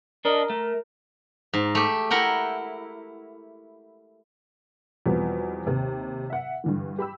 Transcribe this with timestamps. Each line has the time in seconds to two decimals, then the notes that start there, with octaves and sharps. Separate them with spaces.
0.25 D4 A4 A#4 D#5
0.50 A3
1.53 G#2
1.75 A3 G4
2.10 E4 A#4 F#5 G5
5.06 E2 B2 F3 G3 B3 C4
5.66 D#2 C3
6.30 E5 F#5
6.64 G2 D3 E3
6.98 G4 B5 E6